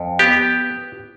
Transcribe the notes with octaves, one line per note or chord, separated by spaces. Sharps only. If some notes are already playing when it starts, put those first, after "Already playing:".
Already playing: F2
B3 G4